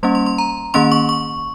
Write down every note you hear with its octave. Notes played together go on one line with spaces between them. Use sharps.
G3 A#3 C#4 C6
C6
C6
A#5
D#3 A#3 C#4 C6
C#6
C#6